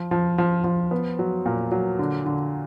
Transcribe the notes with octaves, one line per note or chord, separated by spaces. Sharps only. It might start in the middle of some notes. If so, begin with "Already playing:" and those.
Already playing: F3
F3
F3
F3
B3
F#3
A#2
F#3
D3
D3